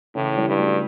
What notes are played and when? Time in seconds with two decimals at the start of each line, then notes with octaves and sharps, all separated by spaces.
0.15 A2 C#3 E3
0.37 E3 G3
0.48 G2
0.58 F#3 A3